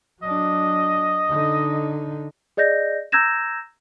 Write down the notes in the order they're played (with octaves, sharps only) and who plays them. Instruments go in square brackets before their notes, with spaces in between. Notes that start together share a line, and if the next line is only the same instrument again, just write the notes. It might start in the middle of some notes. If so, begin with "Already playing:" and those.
[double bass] F#3 D4 [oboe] D#5
[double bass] D3 D#4
[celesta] G#4 D5 D#5 G6 A#6
A#5 E6 G6 G#6 A#6 E7